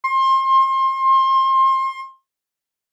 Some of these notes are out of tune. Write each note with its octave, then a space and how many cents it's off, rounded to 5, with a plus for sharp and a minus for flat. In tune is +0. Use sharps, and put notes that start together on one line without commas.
C6 +30